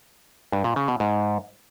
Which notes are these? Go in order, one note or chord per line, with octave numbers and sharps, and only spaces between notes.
G2
A#2
C#3
B2
G#2